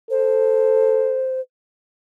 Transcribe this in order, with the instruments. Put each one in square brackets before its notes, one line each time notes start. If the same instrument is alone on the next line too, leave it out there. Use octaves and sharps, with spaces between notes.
[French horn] A4 [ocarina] C5